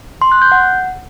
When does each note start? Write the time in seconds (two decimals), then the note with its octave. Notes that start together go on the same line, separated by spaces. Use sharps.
0.22 C6
0.32 F#6
0.42 G6
0.52 F#5